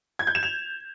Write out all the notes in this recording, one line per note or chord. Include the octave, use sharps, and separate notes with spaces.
G#6
G6
E7
F7